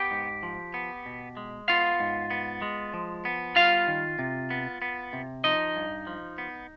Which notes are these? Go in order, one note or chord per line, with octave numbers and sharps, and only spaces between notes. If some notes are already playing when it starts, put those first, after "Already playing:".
Already playing: B3 G4 G5
G#2
F3
B3
B2
G#3
B3 F4 F5
G#2
B3
G#3
F3
B3
G3 F4 F5
D#3
C3
B3
B3
C3
F3 D#4 D#5
G2
F3
B3